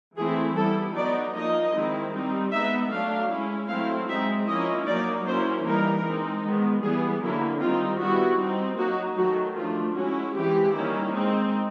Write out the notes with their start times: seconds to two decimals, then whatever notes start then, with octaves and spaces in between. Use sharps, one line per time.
0.17 E3 A3 C4 E4 G#4
0.56 G3 B3 E4 A4
0.95 F#3 B3 D#4 D5
1.35 F3 A#3 D#4 D#5
1.74 D#3 G#3 C4 E4
2.13 G3 C4 D#4
2.52 G#3 B3 D#4 E5
2.91 F#3 A3 D4 F5
3.30 G#3 C#4 E4
3.69 F#3 A3 C4 E4 F5
4.08 G#3 C4 D#4 E5
4.48 F3 A#3 C#4 E4 D#5
4.87 F#3 A#3 D#4 D5
5.26 F#3 A#3 C#4 E4 C5
5.65 E3 G3 A#3 D#4 A#4
6.04 G#3 C4 D#4
6.43 D#3 G#3 B3
6.83 E3 G3 B3 E4 G#4
7.22 D3 F#3 A#3 C#4 E4
7.61 D#3 G3 C4 D#4 F4
8.00 G3 B3 E4 F#4
8.39 G3 C4 D#4
8.79 F#3 A#3 D#4 F#4
9.17 D#3 F#3 A3 F#4
9.57 F3 A3 D4 F4
9.96 G#3 C#4 E4 F#4
10.35 E3 G#3 C4 G4
10.74 D#3 G3 A#3 C#4 E4
11.14 G#3 C4 D#4